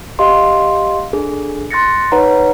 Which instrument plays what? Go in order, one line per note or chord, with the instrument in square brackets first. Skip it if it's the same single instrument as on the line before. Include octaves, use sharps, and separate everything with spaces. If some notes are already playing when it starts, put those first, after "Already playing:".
[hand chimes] G4 D#5 F5 C6
D4 G#4 A4
C6 F#6 A6 A#6 C#7
D#4 B4 C#5 F#5 A#5